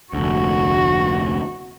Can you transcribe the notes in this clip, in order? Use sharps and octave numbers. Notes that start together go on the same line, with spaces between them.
F1 D2 F#4